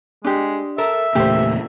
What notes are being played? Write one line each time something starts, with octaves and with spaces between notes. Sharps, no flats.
G#3 D4 G4
A4 A#4 E5
E2 A#2 C#3 A3 A#3 G4 C5